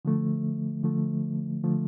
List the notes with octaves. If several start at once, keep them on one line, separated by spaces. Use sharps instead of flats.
D3 F3 A3
D3 F3 A3
D3 F3 A3